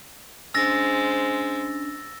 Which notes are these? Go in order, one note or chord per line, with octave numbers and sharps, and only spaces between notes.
G#3 C#4 D4 C5 E6 A6 A#6